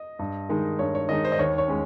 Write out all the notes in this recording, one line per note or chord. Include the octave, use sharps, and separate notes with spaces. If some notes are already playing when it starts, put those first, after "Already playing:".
Already playing: D#5
G2
D#3 G#3 D#4
G2 C#5
C#5
D#3 G#3 D#4 D#5
C5
D#5
D#2 C#5
C#5
G#3 C#4